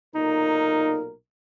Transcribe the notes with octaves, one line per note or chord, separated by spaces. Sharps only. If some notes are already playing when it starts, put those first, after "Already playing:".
B1 A#2 D#4 A#4